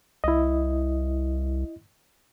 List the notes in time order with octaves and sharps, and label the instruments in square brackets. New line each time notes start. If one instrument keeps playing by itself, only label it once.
[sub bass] C2 [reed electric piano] E4 D#5